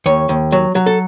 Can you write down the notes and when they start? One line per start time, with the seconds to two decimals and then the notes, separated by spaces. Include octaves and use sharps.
0.06 D#2 C#5
0.29 D#2
0.52 F#3
0.75 F#3
0.86 A4